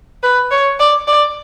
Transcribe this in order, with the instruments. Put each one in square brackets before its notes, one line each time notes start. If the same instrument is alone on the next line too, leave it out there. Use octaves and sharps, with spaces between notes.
[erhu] B4
C#5
D5
D5